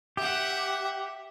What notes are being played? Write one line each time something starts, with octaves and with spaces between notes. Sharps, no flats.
G4 E5 F#5